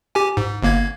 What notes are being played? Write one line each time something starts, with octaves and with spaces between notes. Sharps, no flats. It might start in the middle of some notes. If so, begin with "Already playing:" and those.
G4 G#5
G#2
G1 A#3 G#6